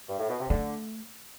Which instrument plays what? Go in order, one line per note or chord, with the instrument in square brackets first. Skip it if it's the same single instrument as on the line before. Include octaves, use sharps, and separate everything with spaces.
[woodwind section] G2
A2
B2
C3
[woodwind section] D3 [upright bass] A3